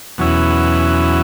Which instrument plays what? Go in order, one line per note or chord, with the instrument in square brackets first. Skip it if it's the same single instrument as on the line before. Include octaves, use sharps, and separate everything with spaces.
[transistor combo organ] E2 B2 F#3 C#4 E4